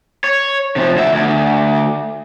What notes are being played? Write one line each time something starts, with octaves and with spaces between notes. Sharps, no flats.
C#5
C3 F3
D2 E5
D2